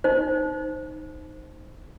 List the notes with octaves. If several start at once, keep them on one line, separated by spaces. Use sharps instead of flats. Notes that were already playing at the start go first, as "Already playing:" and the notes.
D#4 C5